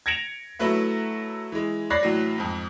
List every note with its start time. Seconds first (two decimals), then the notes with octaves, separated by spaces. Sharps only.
0.06 G#6 A#6 C#7 D7 F7
0.59 F#3 A3 E4 B4 E5
1.52 E3 G#3
1.90 C#5 D5 B5 F#6 A#6 C7
2.03 A2 E3 F#3
2.38 F2 G#2